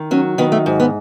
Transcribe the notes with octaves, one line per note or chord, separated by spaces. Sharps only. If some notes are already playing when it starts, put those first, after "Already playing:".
Already playing: D#3
F#3 C#4
D#3 B3
A3
G#2
B3